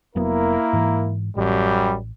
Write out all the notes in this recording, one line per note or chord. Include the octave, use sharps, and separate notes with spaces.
F1 F#3 A#3 B3 E4 A#4
G#2 E3
A1 F#2 G3